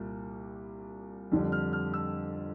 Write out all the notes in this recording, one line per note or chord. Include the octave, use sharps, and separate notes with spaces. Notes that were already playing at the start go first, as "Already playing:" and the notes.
Already playing: C2 A#2 G3
F2 D3 G3 D4
F6
F6
E6